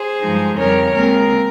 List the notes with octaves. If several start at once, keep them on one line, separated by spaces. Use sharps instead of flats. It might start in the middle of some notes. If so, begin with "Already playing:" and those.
Already playing: G#4 C5
G2 F3 G#3 D#4
F2 C#3 G3 A#4 C#5
D#2 C#3 G#3 C4 A#4